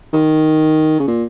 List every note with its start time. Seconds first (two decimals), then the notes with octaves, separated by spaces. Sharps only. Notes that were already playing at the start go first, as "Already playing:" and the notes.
0.13 D#3
1.00 C#3
1.07 A#2